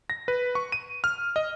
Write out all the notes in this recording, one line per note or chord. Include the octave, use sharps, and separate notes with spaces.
A#6
B4
C#6
D#7
F6
D#5